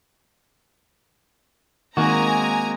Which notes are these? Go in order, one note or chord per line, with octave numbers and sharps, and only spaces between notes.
D#3 G#3 A#3 C4 F#4 G#5 A#5